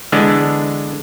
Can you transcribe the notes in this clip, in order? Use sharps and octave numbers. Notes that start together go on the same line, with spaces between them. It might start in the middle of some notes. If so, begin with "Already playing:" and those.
D3 E3 G#3 B3 D4